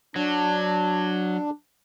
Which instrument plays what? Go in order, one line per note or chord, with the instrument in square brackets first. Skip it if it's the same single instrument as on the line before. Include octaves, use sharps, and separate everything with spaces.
[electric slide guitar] F#3 [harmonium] D4